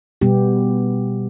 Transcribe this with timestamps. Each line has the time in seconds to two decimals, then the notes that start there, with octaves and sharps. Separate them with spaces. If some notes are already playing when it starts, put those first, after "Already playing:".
0.21 B2 G3 B3 G4